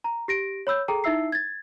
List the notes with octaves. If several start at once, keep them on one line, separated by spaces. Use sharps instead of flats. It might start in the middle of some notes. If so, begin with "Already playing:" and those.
A#5
G4 A#6 D7
C#5 B5 E6 G6
G#4 A4 G5 A#5
D#4 E4 E5 E6 C7
G#6 A6